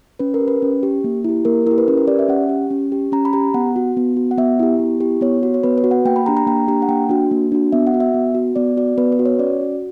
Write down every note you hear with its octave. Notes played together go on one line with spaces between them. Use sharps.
C#4 B4
A#4
G4
B4
C#4
G4
A#3
E4 G4
A#3 A#4
E4 G4 A#4
B4
C#4 A#4
B4
G4 D5
E5
C#4 F#5
G4
C#4
G4
C#4 A#5
B5
G4 A#5
B3 F#5
F#4
B3
F#4
F#5
B3 E5
E4 G4
B3
E4 G4
B3 C#5
F#4
C#5
B3 B4
B4
F#4
F#5
A#3 G5
B5
D4 G4 A#5
A#5
A#3 G5
D4 G4 A#5
F#5
A#3 G5
D4 F#4
A#3
D4 F#4
B3 E5
F#5
F#4
E5
B3
F#4
B3 D5
F#4 D5
B3 B4
B4
F#4
C#5
C#4 D5
F#4